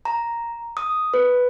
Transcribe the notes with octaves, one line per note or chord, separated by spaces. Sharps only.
A#5
D#6
B4